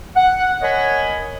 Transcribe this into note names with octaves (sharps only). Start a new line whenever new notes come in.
F#5
A#4 C#5 D#5 G#5 B5